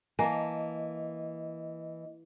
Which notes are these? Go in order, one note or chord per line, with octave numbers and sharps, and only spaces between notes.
E3 A#3 D#5 G#5 A5